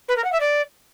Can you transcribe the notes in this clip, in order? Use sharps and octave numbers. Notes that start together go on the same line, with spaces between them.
B4
A#4
F#5
E5
D5